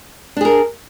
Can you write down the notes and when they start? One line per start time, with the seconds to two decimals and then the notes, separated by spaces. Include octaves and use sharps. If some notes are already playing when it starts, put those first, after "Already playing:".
0.37 D4
0.41 G#4
0.45 A#4